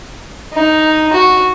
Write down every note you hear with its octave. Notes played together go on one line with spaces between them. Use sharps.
D#4
F#4